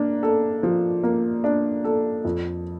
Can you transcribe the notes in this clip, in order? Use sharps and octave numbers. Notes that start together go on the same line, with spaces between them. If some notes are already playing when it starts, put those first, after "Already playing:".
Already playing: A#3 D4
A4
F3
A#3
D4
A4
F2